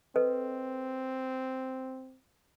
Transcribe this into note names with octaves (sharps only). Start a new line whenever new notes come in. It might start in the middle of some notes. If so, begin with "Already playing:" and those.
C4 A4 B4 D#5